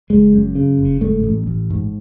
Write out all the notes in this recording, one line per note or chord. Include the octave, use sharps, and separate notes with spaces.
F#1 G#3
F#2
C#3
F#1
G#2 A3
A1
A1
G#2